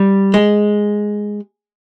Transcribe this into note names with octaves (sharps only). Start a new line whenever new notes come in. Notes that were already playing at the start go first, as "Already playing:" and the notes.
Already playing: G3
G#3